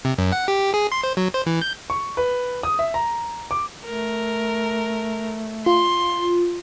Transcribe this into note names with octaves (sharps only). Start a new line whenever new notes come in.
C3
F#2
F#5
G4
G#4
C6
C5
F#3
C5
E3
G6
C#6
B4
D#6
E5
A#5
D6
A3 A#4
F4 C6